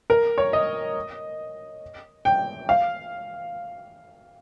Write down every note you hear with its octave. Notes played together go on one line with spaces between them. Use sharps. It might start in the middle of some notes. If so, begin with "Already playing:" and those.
A#4
C#5
D#5
G5
F5